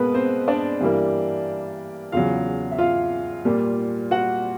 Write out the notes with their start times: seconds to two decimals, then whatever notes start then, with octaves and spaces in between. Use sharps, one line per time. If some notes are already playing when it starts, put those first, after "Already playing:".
Already playing: B2 G#3 A#3 B3 B4
0.14 C4 C5
0.48 D4 D5
0.81 G2 E3 G3 A#3
2.12 E2 C#3 F#3 F4 F5
2.71 E5
2.78 F4 F5
3.45 A#2 G3 A#3
4.11 F#4 F#5